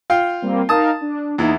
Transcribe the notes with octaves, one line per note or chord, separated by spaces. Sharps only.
F4 F5 G5
G3 A#3 C4
D#4 A#4 F5 A5 D#6
D4
E2 A#3 D#4 E4